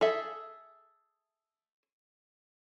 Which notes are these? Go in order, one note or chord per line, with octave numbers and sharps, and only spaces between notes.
G#4 A4 E5